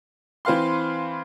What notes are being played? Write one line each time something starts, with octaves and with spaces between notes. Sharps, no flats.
E3 C4 B4 F5 C6